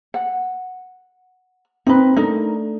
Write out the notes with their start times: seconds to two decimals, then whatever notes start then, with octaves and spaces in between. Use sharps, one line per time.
0.14 F#5
1.87 C4 D#4 B4
2.16 A3 D4 D#4 A#4